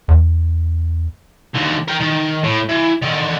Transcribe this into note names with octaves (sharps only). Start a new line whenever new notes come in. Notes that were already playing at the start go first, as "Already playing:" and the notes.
E2
D#2 D3
A#4 G5
D#3
A2
E3
D3 D#3